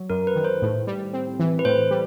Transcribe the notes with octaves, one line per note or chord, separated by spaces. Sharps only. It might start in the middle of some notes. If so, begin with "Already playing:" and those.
Already playing: F#3
F#2 A#4
B4
D#3
C5
A2
G3
C4
E3
B4
A2 C5
G3